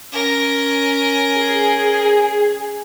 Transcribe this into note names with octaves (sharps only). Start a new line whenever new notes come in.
C#4 A#4
G#4